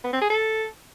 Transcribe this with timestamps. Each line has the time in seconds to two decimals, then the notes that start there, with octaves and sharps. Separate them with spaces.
0.04 B3
0.13 C4
0.22 G#4
0.30 A4